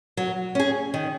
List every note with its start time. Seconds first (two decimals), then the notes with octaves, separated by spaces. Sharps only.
0.17 F#3
0.55 C#4 G#4
0.94 D#3